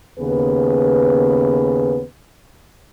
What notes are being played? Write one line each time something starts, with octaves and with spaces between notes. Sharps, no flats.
D#2 C#3 B3 G#4 B4